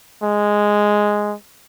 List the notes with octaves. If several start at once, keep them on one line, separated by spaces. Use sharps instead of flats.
G#3